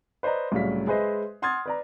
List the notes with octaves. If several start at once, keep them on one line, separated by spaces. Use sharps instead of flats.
B4 C5 D5 D#5 A#5
C2 A2 C#3 F#3 F5 B6
G#3 G#4 B4 C5 D#5 E5
F#5 C6 D#6 F6 G#6 A6
B4 D5 A#5